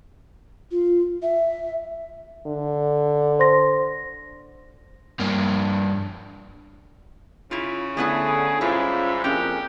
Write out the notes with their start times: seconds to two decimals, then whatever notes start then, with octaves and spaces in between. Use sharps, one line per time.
0.71 F4
1.22 E5
2.46 D3
3.39 C5 C6 A#6
5.19 G2 A#3
7.51 C#3 E4 F4
7.97 D3 A3 B3 E4 G#4
8.61 G#2 G3 C#4 E4 F4
9.24 F2 A#3 C#4 D4 G4 G#4